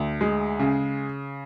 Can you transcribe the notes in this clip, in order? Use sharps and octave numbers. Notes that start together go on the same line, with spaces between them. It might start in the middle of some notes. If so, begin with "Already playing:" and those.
Already playing: D2
G#3
C#3